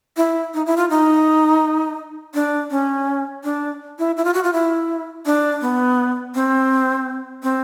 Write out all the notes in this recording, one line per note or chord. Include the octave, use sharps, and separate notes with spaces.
E4
D#4
E4
F4
D#4
D4
C#4
D4
E4
E4
F4
F#4
F4
E4
D4
B3
C4
C4